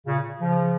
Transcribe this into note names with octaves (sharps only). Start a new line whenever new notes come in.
A#2 C#3
C#3 F3